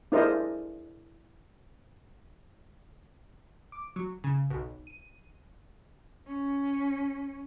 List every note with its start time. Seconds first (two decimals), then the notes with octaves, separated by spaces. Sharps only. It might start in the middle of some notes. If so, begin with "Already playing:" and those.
0.12 D4 E4 G#4 A#4 C5 D#5
3.72 D6
3.96 F#3
4.24 C#3
4.50 B1
4.87 D#7
6.27 C#4